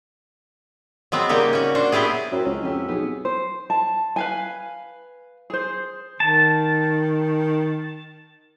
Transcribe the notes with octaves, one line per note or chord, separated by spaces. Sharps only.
F#3 G#3 B3 C4
C#3 G3 A#3 D#4 G4
C#4 F#4
D4 F#4 C5
F#3 B3 E4 G4 G#4
F#2 F#3 C4 E4
C#2 C#4
F2 B3 G4 E5
B1 B3 G#4
C5
A5
B4 F5 G#5
G#4 C5
D#3 A5